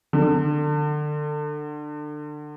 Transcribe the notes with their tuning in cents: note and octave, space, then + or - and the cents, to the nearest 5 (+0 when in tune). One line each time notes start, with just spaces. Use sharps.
D3 +25